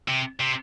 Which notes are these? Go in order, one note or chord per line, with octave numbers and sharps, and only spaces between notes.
C3
C3